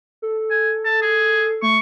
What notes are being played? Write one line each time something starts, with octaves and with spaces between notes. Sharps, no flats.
A4
G#5
A5
G#4
A3 C#6